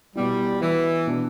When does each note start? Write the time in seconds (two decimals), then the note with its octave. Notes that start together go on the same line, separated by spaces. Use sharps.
0.16 B2 G3 B3 E4
0.61 E3
1.07 B2 B3 D4